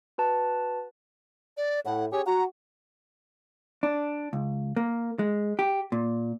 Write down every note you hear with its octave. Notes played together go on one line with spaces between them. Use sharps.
F#4 B4 A5
D5
A2 F#5
C#4 G4 G#4 C#5
F#4 A#5
D4
C#2
A#3
G#3
G4
A#2